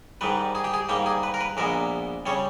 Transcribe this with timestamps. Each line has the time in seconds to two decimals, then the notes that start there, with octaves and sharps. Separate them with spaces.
0.21 G#2 D#3 G3 B4
0.55 G#4
0.64 G4
0.74 G#4
0.89 G#2 G3 A#3 G4
1.06 G#4
1.23 B4
1.34 A#4
1.41 B4
1.57 A#1 A#2 G#3 B3 A#4
2.26 C#3 G3 C#5